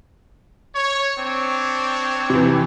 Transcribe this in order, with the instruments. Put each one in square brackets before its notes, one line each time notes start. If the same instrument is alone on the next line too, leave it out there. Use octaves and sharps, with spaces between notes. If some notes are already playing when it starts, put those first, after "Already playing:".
[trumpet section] C#5
C4 D4 C#5
[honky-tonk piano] C3 E3